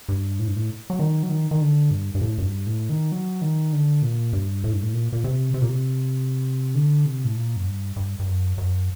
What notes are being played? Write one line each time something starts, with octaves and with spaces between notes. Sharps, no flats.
G2
A2
G2
A2
F#3
D#3
F#3
D#3
D#3
D3
G2
G2
A2
F#2
G2
A2
D#3
F#3
D#3
D3
A#2
G2
A2
G2
A2
A#2
A#2
C3
C3
A#2
C3
D3
C3
A2
A#2
F#2
G2
G2
G2
F#2
F#2